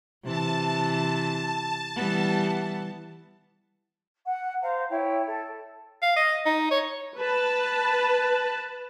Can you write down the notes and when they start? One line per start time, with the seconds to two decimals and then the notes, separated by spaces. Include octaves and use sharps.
0.24 C3 E3 A5
1.96 E3 G3 B3
4.26 F#5
4.62 C5 F5 A#5
4.90 E4 C#5 G5
5.26 A4
6.02 F5
6.16 D#5
6.46 D#4
6.71 C#5
7.18 B4 A5